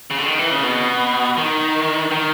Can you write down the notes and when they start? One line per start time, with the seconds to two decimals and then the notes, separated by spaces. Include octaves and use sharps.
0.11 C#3
0.18 D3
0.26 D#3
0.38 E3
0.51 C#3
0.63 B2
1.37 D#3
2.11 D#3